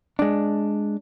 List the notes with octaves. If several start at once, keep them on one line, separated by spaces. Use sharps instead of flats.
G#3 D4